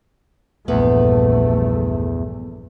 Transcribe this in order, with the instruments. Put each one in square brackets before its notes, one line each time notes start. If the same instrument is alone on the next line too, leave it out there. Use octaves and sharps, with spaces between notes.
[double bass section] A#1 G2 A3 [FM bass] E2 [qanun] B3